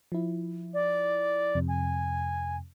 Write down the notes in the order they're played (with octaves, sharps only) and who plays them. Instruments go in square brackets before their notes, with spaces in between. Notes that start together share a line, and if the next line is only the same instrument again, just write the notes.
[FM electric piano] F3 E4
[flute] D5
[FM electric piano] F2 C3
[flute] G#5